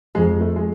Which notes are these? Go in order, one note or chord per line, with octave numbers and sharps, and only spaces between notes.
F2 G#3
A3
G#3